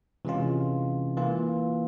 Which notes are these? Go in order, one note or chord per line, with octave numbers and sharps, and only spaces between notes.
C3 E3 G#3 C#4 F4
E3 A#3 F4